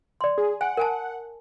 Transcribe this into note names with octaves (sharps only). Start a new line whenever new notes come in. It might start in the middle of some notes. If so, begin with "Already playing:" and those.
D5 C6
G#4
F#5 G#5
A#4 G#5 A5